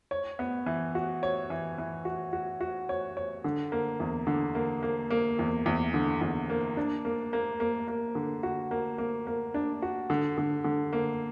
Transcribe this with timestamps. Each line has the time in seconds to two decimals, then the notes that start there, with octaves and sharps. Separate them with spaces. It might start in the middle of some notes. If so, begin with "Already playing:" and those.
0.11 C#5
0.39 B3
0.66 E3
0.95 F#4
1.23 C#5
1.50 E3
1.78 E3
2.05 F#4
2.33 F#4
2.61 F#4
2.89 C#5
3.17 C#5
3.44 D3
3.72 A#3
4.00 E2
4.27 D3
4.55 A#3
4.83 A#3
5.11 A#3
5.39 E2
5.66 E2
5.94 D3
6.21 E2
6.50 A#3
6.77 D4
7.05 A#3
7.33 A#3
7.60 A#3
7.88 A#3
8.15 D3
8.43 F#4
8.71 A#3
8.98 A#3
9.27 A#3
9.54 D4
9.82 F#4
10.10 D3
10.38 D3
10.64 D3
10.93 A#3